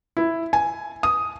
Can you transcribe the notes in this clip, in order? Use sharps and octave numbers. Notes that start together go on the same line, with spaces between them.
E4
G#5
D#6